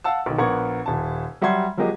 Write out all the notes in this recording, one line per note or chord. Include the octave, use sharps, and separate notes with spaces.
F5 F#5 A5 E6
B1 D#3
A#1 B3 A#4 F#5 C#6 G#6
D#1 A5
F#3 G3 E5 F#5 C6 G#6
F3 F#3 G#3 A#3 G4 D#5